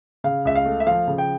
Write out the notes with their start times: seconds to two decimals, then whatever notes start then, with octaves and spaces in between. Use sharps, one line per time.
0.24 C#3 F5
0.45 C#2 E5
0.55 F5
0.65 A3
0.80 E5
0.87 F3 F5
1.08 C#3
1.18 G5